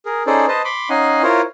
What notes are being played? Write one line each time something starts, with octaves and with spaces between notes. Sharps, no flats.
G#4 A#4
C#4 D#4 G#4 A4 C5 D5
B4 C5 D#5 A5
B5 C6 D6
C#4 D#4 D#5 F5 F#5 G#5
E4 F4 A#4 C5 C#5